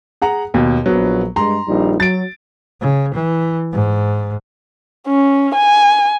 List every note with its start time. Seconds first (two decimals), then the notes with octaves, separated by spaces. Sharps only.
0.22 G#4 F#5 A#5
0.54 D#2 B2
0.86 A#1 F#3 B3
1.36 G2 G#3 A#5 C6
1.68 A#1 G3 D#4
2.00 F#3 A6 D7
2.81 C#3
3.14 E3
3.73 G#2
5.08 C#4
5.55 G#5